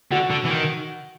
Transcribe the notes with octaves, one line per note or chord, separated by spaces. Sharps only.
D3 F#4
D3
E3
D#3